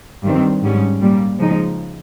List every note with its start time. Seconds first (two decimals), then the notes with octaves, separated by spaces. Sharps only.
0.24 G2 D#3 G3 C4
0.63 G#2 G3 C#4
1.01 A#2 G3 A#3
1.39 C#3 F3 G#3 D#4